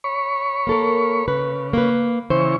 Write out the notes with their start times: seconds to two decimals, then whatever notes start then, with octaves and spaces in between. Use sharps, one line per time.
0.04 C#5 B5 C#6
0.67 A#3 A4 A#4
1.28 C#3 B4
1.73 A#3 B4
2.30 C#3 E3 C5 C#6